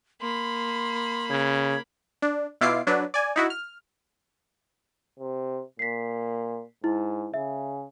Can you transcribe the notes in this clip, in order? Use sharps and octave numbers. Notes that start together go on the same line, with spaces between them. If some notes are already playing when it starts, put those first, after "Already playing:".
A#3 B5 C6
C#3 G#6
D4
B2 E4 F4 D6 C7
F#3 D4 B4
D5 G#5
D#4 E4 F#4
F6
C3
A#2 B6 C7
G#2 E4
C#3 E5